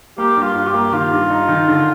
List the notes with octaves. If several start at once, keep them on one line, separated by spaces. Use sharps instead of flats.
A#3 G4
G2
F4
G2
G4
A#3
D#3 F4
G2
D#4
D#3
D3